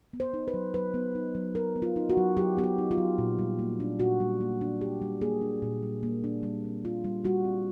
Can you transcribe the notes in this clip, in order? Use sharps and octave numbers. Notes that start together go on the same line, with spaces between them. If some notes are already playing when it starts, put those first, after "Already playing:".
B3
C5
D#4
B4
F#3
F#3 B4
B3
D#4
F#3
F#3 A#4
B3
F4
D#4
F#4
F#3
F#3 G4
B3 G4
F#4
D#4
F4
F#3
A#2
G3
A#3
D4
A#2 F#4
G3
A#3
D4
A#2 G4
G3
A#3 G#4
D4
A#2
G3
A#3
D4
G3
C4
F4
G3
G3 F#4
C4